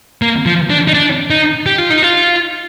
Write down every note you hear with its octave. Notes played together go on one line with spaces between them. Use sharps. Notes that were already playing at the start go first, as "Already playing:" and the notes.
A#3
F3
D4
D#4
D4
D#4
G4
F4
D#4
F4